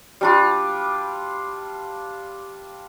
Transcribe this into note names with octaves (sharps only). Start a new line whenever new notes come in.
G3 D4 F4